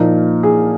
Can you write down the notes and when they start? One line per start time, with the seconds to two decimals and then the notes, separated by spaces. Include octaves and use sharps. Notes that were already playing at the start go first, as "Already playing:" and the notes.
Already playing: A#2 F3 A#3 D#4 A#4
0.43 G#4